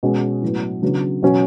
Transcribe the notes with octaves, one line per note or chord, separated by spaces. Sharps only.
B2 G#3 C#4
A2 F#3 B3
C#3 F#3 B3 D4
B2 F#3 C#4